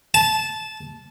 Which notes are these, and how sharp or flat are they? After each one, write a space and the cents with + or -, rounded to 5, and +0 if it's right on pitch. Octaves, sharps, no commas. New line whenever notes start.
A5 -15